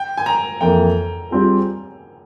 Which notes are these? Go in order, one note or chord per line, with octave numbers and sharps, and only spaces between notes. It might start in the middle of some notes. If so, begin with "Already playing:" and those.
Already playing: G5
G#5
A#5
F2 E3 A#3 G5
G3 C4 F4 G#4